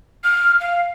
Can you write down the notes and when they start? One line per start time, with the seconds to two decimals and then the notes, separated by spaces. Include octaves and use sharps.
0.24 F6
0.60 F5